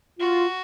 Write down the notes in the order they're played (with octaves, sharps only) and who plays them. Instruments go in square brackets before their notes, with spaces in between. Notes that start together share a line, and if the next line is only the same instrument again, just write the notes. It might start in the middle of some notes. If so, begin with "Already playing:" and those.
[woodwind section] F4 [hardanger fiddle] F#4